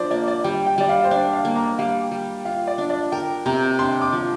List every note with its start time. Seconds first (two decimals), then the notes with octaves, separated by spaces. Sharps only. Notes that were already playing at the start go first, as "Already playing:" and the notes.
Already playing: F3 D4 C5 D5
0.11 A#3 D5
0.28 D5
0.44 G3 G5
0.66 G5
0.78 G3 D5
0.89 F5
1.04 C5
1.11 D4 D5
1.33 F5
1.45 A#3
1.56 A#5
1.79 G3 F5
2.11 G3
2.45 F4 F5
2.67 D5
2.78 D4
2.90 D5
3.12 A#4 G5
3.46 C3 A#5
3.79 D4 C6
4.02 D6
4.12 F3